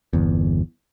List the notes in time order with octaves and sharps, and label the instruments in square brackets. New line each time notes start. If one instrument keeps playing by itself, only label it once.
[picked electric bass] G1 E2